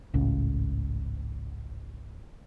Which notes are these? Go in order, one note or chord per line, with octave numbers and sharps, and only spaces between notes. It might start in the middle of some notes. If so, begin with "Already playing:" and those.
G#1 C#2 A2 C#4